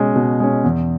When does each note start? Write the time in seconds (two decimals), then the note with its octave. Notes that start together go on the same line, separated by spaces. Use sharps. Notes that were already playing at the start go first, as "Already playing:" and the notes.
Already playing: B2 G#3 C#4
0.16 B2
0.40 G#3 C#4
0.64 E2